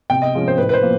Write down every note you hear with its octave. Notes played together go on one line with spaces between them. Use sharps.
C3 G5
D#5
F3 G#3 C#4
C5
A2 B4
B4
C5
F3 A#3